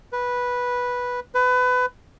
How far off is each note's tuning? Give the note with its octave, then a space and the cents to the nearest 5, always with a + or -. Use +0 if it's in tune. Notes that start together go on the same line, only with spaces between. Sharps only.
B4 -10
B4 +25